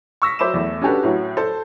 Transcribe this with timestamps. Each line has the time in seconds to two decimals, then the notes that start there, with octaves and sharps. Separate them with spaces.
0.22 C#6 E6 A#6 B6
0.39 F#3 C5 E5 B5 D6 E7
0.54 E2 A3
0.82 C#4 D4 F#4 G4 A4 B4
1.03 A2 F#3 F#4
1.37 A4 C5 A5